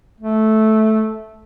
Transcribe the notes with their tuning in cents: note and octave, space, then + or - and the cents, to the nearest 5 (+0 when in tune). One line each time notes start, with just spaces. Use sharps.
A3 -10